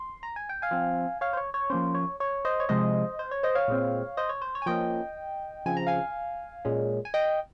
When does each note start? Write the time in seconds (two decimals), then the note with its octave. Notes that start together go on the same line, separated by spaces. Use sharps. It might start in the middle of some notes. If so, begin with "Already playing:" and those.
Already playing: C6
0.23 A#5
0.36 G#5
0.49 G5
0.62 F5 G#5
0.71 F3 C4
1.21 C#5 F5
1.33 C5
1.37 C#5
1.54 C#5
1.70 F3 A#3 C#4 C5
1.95 C#5
2.20 C#5
2.45 C5 D#5
2.60 C#5
2.69 C3 F3 G#3 C5 D#5
3.19 C5
3.31 C#5
3.43 C5 D#5
3.55 C#5 F5
3.68 A#2 G#3 C4
4.17 C5 D#5
4.29 C#5
4.42 C5
4.55 C#5
4.62 G#5
4.66 F3 A#3 C#4 D#5 G5
5.66 C#3 F3 C4 G#5
5.77 A#5
5.87 F5 G#5
6.65 A#2 G#3 C#4
7.05 G#5
7.14 D#5 G5